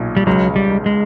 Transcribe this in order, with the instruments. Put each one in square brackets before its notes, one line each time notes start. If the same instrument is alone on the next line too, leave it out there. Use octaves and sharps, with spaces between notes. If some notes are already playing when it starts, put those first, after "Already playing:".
Already playing: [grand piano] B1 A#2
[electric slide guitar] G3
[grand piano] C#2 [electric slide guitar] F#3
[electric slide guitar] G3
[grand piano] C#2
[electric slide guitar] G#3